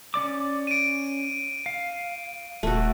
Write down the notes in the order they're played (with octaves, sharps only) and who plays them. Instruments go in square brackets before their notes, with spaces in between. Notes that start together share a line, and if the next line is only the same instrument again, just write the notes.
[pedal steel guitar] C#4 D5 D6
[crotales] D7 D#7
[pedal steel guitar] F5
[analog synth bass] D#1 [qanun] A3 F#4